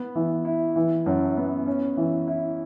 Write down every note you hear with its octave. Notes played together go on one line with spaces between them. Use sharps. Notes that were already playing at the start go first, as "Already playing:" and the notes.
Already playing: B3
E3
E4
E3
F#2
B3
C#4
E3
E4